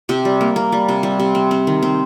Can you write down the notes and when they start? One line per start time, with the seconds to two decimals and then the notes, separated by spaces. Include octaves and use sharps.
0.09 C3 G4
0.25 G3
0.41 A#3
0.56 A#3
0.72 G3
0.88 C3
1.03 G3
1.20 C3
1.35 C4
1.51 C4
1.67 D#3
1.83 C4